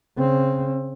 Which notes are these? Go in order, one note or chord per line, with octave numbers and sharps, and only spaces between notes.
C#3 C4